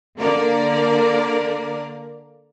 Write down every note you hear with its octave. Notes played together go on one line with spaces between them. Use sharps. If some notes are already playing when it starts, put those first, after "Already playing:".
D3 A#3 A#4 D5